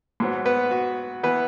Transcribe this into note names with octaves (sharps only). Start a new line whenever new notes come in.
G#2 F#3 B3
B3 B4
F#4
E3 B3 B4